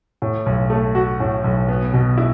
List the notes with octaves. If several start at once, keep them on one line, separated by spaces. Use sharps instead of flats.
A2
B1
A3
F#4
A2
B1
B3
B2
E4